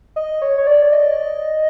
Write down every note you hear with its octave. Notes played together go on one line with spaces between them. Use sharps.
D#5
C#5
C#5
D5
D#5